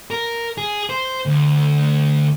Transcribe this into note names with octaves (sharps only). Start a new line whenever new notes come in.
A#4
G#4
C5
D2